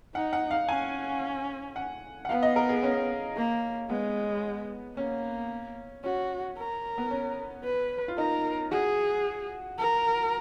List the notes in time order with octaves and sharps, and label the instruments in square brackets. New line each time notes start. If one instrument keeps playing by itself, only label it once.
[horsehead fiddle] D#4 [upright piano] F#5
[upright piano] F#5
F5
[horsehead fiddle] C#4 [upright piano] G#5
[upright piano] F#5
F#5
[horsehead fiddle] B3 [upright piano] F5
[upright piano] D#5
A#4
G#4
C#4
[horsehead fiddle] A#3
[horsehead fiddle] G#3 [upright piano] B3
[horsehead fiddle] A#3 [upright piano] C#4
[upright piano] C#4 [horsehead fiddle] F#4
[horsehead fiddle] A#4
[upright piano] B3
C#4
[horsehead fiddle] B4
[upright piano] F4
[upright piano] D#4 [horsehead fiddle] A#4
[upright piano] F#4 [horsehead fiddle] G#4
[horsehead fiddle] A#4